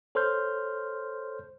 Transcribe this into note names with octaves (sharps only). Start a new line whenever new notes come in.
A4 C5 C#5 C6 F6 G6